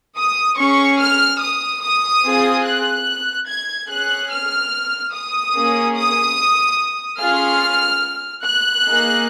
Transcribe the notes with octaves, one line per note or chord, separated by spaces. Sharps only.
D#6
C#4 G#4 C#6
F6
D#6
D#6
C4 F4 G#4
F#6
G#6
C#4 G#4 F#6
F6
D#6
A#3 C#4 G#4
D#6
C#4 F4 G#4 F6
F#6
A#3 D#4 G#4